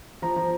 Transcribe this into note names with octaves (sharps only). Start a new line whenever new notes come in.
F3 A#5
F3